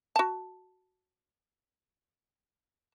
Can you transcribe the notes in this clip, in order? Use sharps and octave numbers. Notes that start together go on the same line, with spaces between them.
F#4 A5